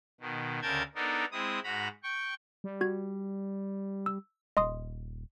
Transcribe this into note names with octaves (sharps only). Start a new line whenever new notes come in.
B2 D#3
D2 C#3 A#4 G5 A5 G#6
B3 D4 D#4 A4 A#4
G#3 C4 E4 D#6
G#2 F#4 A#5 B5
G5 C#6
G3
F#4 G#6
E6
D#1 D#5 C6 D#6